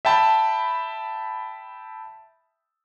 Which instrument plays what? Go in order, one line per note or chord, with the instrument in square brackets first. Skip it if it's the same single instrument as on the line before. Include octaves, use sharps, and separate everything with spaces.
[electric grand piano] E5 G5 A5 B5